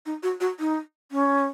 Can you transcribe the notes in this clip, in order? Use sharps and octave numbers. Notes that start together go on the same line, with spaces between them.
D#4
F#4
F#4
D#4
C#4